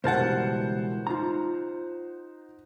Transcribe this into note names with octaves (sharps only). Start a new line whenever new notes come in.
C#2 B2 E3 G3 A#4 C5 F#5 A5
D#4 F4 A#5